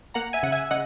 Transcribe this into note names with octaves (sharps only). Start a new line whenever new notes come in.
A#3 F#5 A#5
E5 G#5
C#3 F#5
E5 G#5
C#3 D#5 F#5